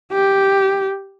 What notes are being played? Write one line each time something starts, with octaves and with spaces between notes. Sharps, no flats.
G4